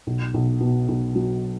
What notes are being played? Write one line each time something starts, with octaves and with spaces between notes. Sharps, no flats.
B1
B1
B2
B1
F#3